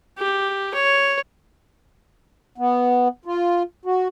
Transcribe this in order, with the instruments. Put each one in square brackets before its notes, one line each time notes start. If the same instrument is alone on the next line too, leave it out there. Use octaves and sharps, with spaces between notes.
[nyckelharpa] G4
C#5
[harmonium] B3
F4
F#4